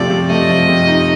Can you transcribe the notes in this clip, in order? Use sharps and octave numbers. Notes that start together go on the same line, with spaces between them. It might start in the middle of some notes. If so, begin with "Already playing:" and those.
Already playing: C3 F3 A3 D5
C3
A3 D#5
F3
C3
D#4